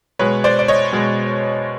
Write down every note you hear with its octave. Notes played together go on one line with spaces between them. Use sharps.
B2 G#3 B4 C#5
C5 D5
D5
C#5 D#5
B2 G#3